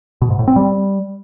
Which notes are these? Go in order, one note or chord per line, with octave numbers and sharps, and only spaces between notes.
B2
G#2
A2
C4
G3